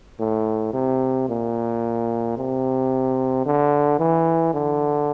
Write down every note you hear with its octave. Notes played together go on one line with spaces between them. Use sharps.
A2
C3
A#2
C3
D3
E3
D3